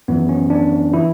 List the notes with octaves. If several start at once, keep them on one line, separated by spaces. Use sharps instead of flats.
F#2 E3 B3
C#4
D4
E3 E4